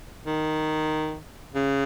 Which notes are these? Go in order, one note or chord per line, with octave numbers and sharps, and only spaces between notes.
D#3
C#3